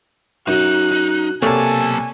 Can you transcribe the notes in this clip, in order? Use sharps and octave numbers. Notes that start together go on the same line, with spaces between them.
F#2 D#4 F#6
D#4
B1 C3 A#3 A4 C#5 D5 G#5 A5